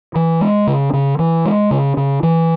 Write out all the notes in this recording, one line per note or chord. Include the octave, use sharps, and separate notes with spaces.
E3
G#3
C#3
C#3
E3
G#3
C#3
C#3
E3